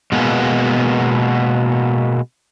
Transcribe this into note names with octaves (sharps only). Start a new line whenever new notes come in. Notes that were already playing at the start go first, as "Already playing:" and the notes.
B2 G#3 A#3 B3